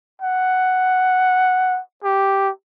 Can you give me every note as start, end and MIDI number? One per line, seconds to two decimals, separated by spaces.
0.21 1.80 78
2.04 2.50 67